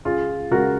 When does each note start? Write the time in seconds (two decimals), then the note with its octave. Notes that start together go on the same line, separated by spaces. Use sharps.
0.05 C#2 F4 G#4
0.51 C#3 G#3 F#4 A#4